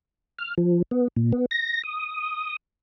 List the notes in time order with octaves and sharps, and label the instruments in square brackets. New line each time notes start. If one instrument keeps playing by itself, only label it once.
[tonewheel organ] F6
F3
B3
A#2
B3
A#6
D#6